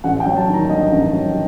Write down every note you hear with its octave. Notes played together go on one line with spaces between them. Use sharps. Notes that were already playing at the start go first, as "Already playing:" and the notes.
A1 F#5
G5
F#3
A5
D#3
A#5
G2 D#5
A1
F#3